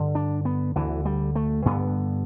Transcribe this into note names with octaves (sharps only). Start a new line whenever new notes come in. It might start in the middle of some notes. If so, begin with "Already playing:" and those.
Already playing: G2 D3
D4
B3
D2 D3 E3
G3
A3
G2 D3 B3